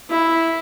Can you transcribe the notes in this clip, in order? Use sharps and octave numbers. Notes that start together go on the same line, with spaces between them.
E4